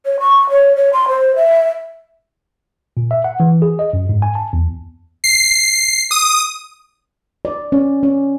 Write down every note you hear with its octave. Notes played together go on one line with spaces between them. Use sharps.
C#5
C#6
C#5
C#5
C6
C5
E5
A#2
E5
F#5
E3
G#4
D#5
F#2
G#2
G#5
A5
E2
C7
D#6
D5
C#4
C#4